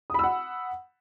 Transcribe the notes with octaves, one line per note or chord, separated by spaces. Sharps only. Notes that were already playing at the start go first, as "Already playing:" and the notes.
F#5 B5 D#6 E6